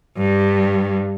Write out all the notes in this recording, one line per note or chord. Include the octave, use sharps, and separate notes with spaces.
G2